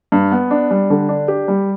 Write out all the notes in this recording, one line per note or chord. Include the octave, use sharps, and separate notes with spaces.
G2
B3
D4
G3
D3
D4
G4
G3